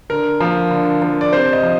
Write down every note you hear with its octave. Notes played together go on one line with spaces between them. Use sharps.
D3 A#4
F3 A#3
D3
F3 A#3
D5
C3 C5
D#5
F3